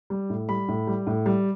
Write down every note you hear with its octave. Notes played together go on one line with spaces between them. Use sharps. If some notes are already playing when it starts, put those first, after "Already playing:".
G3
A2
G3 B5
A2
G3
A2
G3